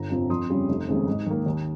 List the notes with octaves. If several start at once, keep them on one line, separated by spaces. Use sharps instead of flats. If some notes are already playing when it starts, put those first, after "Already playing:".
Already playing: G1 A#5
F2 C3 F3 C4
F2 C6 D#6
C#3 G3 C#4
F1
D#2 C#3 G#3 C4
G#2
D#3 A#3
D#2